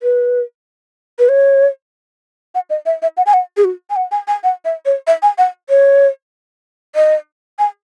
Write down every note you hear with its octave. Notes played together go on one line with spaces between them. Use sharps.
B4
B4
C#5
F#5
D#5
E5
E5
F#5
G#5
F#5
G#4
F#4
G#5
F#5
G#5
G#5
F#5
E5
C#5
E5
G#5
F#5
C#5
D#5
G#5